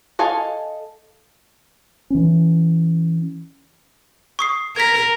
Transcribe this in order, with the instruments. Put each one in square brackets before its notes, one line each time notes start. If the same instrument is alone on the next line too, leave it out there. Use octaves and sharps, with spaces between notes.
[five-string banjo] A4 D#5 F5 G#5
[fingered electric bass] E3 C#4
[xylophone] C#6 D#6 C7
[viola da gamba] A#4 [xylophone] G#6 B6